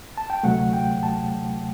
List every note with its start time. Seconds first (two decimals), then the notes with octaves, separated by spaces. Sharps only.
0.17 A5
0.30 G5
0.43 D2 C3 F#3 A3 F#5
0.73 G5
1.03 A5